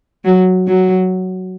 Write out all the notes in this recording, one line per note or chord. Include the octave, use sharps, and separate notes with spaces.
F#3
F#3